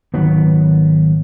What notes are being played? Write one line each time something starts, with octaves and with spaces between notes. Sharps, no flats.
G#1 D#3 F#3 B3